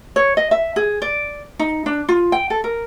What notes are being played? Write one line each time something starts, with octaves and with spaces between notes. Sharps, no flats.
C#5
D#5
E5
G#4
D5
D#4
D4
F4
G5
A4
A#4